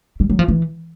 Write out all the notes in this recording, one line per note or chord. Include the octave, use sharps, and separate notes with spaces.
G3
F#3
F3
E3